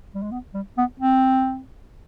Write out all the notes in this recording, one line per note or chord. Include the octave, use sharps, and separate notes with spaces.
G3
G#3
B3
G3
B3
C4